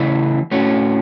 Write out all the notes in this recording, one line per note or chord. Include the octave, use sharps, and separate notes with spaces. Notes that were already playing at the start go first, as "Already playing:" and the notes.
Already playing: C#3 E3 A3 E4
A2 A3 C#4 F#4